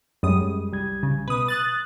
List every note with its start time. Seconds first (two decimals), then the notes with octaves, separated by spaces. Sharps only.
0.23 F#2 G3 G#3 D#6
0.72 C2 G3 G#6
1.03 C#3
1.28 B2 B4 D#6
1.48 D#6 F#6 A6